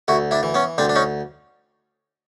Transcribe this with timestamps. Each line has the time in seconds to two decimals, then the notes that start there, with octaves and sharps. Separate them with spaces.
0.08 D2 E4 F#4
0.31 D4 E4
0.43 E3
0.54 B3 C#4
0.78 D2 C4 D4
0.89 D4
0.95 C#4 D#4